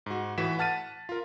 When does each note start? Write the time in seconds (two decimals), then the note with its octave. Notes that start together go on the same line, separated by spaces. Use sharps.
0.06 G#2 F#4
0.38 A2 E3 F#4 B6 E7
0.59 F#5 A5 F6 A6 B6 D#7
1.09 F4 A#4